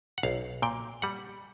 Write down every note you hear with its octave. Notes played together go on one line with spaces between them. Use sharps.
F#5
B1 F5
A#2 G5
G3 F#5